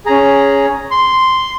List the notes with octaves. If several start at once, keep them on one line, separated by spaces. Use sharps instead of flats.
C#4 G#4 A#5
C6